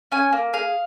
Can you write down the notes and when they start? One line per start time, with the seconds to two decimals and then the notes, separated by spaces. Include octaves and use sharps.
0.12 C#4 G#5
0.33 A#3
0.53 G#4 F5